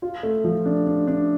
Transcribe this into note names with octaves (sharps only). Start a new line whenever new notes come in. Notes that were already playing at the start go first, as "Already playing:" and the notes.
F4
A3
F3
D4
D4
D4